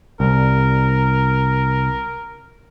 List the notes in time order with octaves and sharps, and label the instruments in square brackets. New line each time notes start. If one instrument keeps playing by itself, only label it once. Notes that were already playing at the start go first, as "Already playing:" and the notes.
[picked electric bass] C2 [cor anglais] A#4